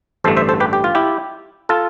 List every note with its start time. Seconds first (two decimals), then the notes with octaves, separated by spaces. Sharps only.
0.24 A1 G2 D3 A3 A4 C5
0.37 C5 E5
0.49 A4 C5
0.60 G4 B4
0.73 G4
0.84 F4
0.95 E4 G4
1.69 F4 A4